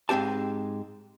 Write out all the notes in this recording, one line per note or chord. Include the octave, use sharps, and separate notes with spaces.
G#2 G#3 C4 G4 A5